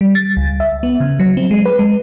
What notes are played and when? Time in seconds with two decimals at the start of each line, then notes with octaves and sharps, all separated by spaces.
0.01 G3
0.15 A6
0.37 C#2
0.60 E5
0.83 B3
1.00 C#3
1.20 F#3
1.37 C4
1.51 G#3
1.65 B4
1.79 G#3